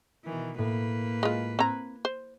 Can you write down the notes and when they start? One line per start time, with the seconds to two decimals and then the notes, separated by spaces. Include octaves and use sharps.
0.25 B2 D#3 E3
0.58 A2 A#3 B4
1.23 G#3 F4
1.59 C4 A#5 F#6 G#6
2.05 C5